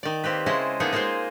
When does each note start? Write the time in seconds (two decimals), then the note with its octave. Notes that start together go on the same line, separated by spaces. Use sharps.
0.03 D#3 D5
0.24 A#3 C4 G4 B4
0.46 C#3 G#3 E4 C5 D#5 A5
0.80 A#3 B3 D#4 G#4 A4
0.93 G#3 A#3 F4 G#4 C5